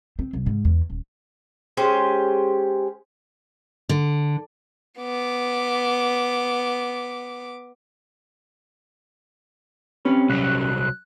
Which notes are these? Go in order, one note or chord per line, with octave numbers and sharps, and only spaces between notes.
C4
C2
G#2
E2
D#1
G#3 C#4 G4 C5
D3
B3 D6
C4 C#4 G4 B4
C2 F#3 F#6